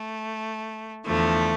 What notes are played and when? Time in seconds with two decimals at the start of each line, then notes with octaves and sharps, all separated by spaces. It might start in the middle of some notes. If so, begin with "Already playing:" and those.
Already playing: A3
1.05 E2 D3 F3 A3